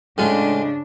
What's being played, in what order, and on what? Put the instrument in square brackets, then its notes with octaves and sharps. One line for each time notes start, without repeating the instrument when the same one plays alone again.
[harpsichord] A2 G#3 F4 [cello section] C#3 D4